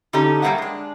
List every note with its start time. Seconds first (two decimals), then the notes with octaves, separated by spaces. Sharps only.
0.13 D3 C#4 D#4 G4 A4
0.42 G3 A#3 D#4 C#5 E5 F#5
0.58 G#3 D4